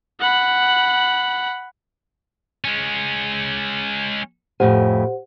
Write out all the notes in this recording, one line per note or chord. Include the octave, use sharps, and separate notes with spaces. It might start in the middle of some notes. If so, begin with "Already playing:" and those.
F#5 B5
G#3 C#4
F2 A2 G4 C5 F#5 G#5